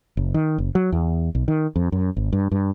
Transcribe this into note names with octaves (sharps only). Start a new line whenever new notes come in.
F#1
D#3
F#1
F#3
E2
B1
D#3
F2
F#2
G#1
G2
G2